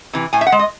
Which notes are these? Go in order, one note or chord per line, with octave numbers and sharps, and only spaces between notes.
C3 E3
A2 G#5
E5
F#5
G#3
D#5